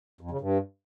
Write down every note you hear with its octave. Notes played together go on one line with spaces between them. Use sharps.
F2
C#3
G2